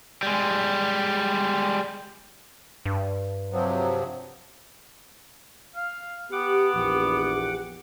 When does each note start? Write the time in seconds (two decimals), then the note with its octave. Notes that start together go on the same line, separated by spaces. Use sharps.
0.23 G3 G#3
2.86 G2
3.52 C3 F3 F#3
5.76 F5
6.32 B3 G4 F#5 D6
6.74 A#1 E2 G4